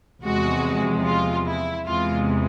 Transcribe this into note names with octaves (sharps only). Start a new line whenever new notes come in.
E2 C3 F3 G#3 F#4
F4
E4
E2 C3 E3 G#3 F4